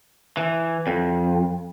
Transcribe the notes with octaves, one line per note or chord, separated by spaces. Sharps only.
E3
F2